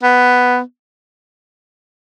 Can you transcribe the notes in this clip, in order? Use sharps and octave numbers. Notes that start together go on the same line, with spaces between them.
B3